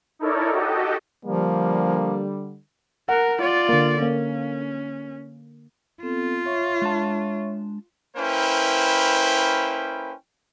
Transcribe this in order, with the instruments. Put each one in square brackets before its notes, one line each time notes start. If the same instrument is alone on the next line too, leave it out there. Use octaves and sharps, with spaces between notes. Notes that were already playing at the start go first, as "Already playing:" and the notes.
[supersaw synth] D#4 E4 A4 A#4 C#5 D5
F#4 G4 A4 D#5
[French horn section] D3 G3 [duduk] F3 [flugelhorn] A#3
[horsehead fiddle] A#4 [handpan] F#5
[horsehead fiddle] F4 D5
[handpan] D3 A#3
[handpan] A#3 [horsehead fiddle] C#4
[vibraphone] B3 C4 A4 [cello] F4
[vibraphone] C#5 E5 C#6
[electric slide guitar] G#3 D4 A5
[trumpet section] A#3 C#4 E4 B4 C5 G5